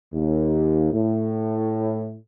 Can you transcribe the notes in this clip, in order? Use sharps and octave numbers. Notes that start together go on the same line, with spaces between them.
D#2
A2